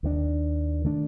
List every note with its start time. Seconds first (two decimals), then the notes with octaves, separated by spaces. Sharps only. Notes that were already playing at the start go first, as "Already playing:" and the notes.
0.03 D#2 D#3 A#3 D4
0.84 D#3 A3 D4